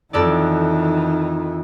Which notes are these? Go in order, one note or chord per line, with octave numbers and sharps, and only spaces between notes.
F2 D#3 E3 A4 D5